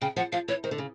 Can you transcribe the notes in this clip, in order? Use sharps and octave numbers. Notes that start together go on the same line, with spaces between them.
C#3 G5
F3 F#5
F3 F5
E3 C#5
D#3 C5
D3
C#3